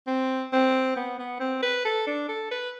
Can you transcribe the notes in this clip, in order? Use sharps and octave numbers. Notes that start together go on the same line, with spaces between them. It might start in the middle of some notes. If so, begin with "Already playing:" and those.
C4
C4
B3
B3
C4
B4
A4
D4
A4
B4